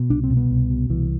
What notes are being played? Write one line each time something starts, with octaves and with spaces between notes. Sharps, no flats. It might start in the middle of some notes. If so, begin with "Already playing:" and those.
Already playing: B2
C2 D4
C4
B2
B3
C2
B2
C2 E3